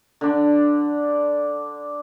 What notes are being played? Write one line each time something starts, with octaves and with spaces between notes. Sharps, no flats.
D3 D4